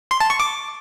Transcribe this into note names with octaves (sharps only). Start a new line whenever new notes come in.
C6
A5
C#6
D6